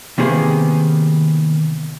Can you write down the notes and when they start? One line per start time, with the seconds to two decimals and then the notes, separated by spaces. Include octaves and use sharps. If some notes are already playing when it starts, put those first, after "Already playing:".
0.18 C3 D#3 A#3 B3 G#4 C5